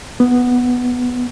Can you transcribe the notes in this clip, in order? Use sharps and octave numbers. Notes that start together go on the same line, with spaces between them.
B3